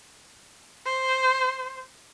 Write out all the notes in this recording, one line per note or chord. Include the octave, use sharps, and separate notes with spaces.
C5